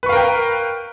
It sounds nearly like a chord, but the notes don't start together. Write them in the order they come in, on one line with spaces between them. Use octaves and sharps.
B4 C#6 F5 A#4 G5